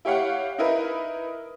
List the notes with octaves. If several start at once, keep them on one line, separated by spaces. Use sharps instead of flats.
E4 G4 C#5 F5 F#5
D#4 E4 A#4 B4